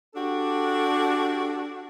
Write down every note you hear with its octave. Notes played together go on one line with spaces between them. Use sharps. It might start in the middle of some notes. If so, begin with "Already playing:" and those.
D4 F#4 G4 A4